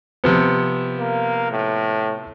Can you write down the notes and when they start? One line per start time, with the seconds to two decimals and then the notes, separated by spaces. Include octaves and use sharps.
0.24 C3 F3 B3
0.99 A#3
1.51 A2